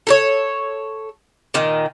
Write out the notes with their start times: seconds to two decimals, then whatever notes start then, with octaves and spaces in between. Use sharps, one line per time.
0.07 A4 A#4 C#5
1.54 A#2 D#3